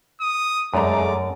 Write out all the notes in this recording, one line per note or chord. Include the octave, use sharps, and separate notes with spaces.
D#6
F1 F#2 G#3 A3 D5 A#5 D6